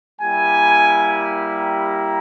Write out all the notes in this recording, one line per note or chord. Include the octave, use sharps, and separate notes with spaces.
G3 A#3 E4 G4 G#5
A#5